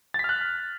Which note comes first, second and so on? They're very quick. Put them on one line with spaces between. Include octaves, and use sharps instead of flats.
A6 B6 F6 F#6